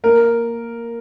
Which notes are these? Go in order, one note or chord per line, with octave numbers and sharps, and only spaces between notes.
A#3 A#4